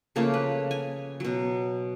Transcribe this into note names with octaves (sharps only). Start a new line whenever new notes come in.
C#3 F3 A3 A#3
B4
G#5
B2 F#3